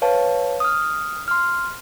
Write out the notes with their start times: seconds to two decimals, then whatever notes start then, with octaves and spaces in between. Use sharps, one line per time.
0.02 B4 C#5 F5 A5
0.60 D#6 F6
1.28 C6 F6